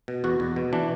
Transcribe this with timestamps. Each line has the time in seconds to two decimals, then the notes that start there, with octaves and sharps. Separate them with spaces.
0.08 B2
0.24 E2 F#4
0.40 E2
0.56 B2
0.73 E3 D4